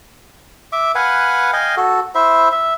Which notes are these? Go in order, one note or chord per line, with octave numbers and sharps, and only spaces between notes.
E5 D6
B4 F5 F#5 G#5
D#5 F5 G5 G#5
F#4 A4
E4 C5 E5
E5